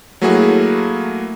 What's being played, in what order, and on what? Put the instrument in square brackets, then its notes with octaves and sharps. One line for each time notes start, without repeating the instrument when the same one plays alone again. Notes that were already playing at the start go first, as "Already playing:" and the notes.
[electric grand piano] F#3 A3 A#3 E4 F#4 G#4